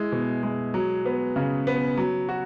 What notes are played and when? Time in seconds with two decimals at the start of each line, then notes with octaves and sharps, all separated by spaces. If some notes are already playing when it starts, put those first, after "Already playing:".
Already playing: G#3 E4
0.12 B2
0.43 G#3
0.74 F#3
1.06 B3
1.36 C#3
1.67 B3
1.97 F#3
2.29 F#4